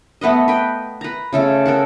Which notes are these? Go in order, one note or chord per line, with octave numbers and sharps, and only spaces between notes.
A3 B3 B4 D#5
B4 G5
B4 A#5
C#3 A3 A4
A4 A#4 F#5